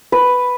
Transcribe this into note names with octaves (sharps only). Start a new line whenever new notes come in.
B4